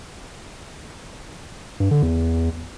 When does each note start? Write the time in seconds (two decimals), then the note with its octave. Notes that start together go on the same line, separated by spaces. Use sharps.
1.80 G2
1.91 D3
2.02 E2